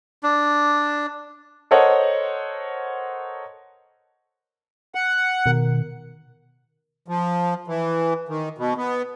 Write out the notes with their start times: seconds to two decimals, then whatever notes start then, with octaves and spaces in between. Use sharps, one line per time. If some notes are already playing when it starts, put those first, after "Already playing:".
0.23 D4
1.71 A4 A#4 C5 C#5 D#5 F#5
4.95 F#5
5.46 B2 D#3 A#4
7.08 F3
7.67 E3
8.29 D#3
8.58 B2
8.77 B3